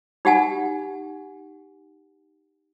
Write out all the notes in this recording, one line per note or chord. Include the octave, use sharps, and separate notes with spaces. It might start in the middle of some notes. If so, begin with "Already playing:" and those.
D#4 G4 F#5 G#5